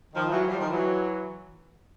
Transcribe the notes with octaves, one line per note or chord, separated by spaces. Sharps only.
D#3 F3
E3 F#3
F3 G3
D#3 F3
E3 F#3